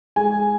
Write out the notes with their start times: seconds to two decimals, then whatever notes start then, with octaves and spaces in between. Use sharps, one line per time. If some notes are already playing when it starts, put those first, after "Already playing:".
0.16 G#3 G#5